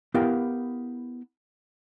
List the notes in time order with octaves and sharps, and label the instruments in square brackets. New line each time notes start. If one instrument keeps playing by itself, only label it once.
[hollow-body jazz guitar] B3 E4 G4 A#4 F5 G5